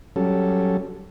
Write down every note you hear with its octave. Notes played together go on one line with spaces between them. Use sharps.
F#3 G3 C#4 A4